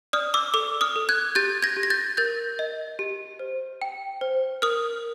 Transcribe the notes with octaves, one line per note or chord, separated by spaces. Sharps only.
D5 D#6 F6
D6 E6
A4 D6 E6
D#6 F6
A4
F#6 G#6
G4 G6 A6
G#6 A#6
G4
A#6
G6 A6
A#4 G6 A6
D#5
G4
C5
G5
C5
A#4 D#6 F6